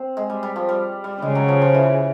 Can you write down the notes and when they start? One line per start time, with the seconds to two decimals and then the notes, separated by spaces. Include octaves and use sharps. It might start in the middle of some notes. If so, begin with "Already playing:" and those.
Already playing: C4
0.17 G#3
0.30 G3
0.43 G3
0.56 F3
0.69 G3
1.04 G3
1.21 C#3 G#3
1.35 F#3
1.48 F3
1.62 F3
1.74 E3